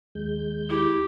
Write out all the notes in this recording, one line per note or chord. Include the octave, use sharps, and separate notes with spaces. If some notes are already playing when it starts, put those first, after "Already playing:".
D#2 G#3 G6
E4 G4